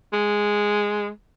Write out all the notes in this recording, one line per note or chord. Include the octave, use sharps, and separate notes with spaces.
G#3